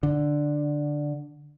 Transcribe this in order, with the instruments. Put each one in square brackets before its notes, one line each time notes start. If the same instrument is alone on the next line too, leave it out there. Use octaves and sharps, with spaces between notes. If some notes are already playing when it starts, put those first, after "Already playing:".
[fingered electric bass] D3